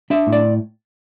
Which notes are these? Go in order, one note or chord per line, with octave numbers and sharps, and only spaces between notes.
D4 E5
A2
D5